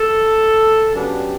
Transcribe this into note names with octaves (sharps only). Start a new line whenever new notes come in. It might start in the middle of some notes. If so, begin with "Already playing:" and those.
Already playing: A4
C#3 F#3 B3 D4 G4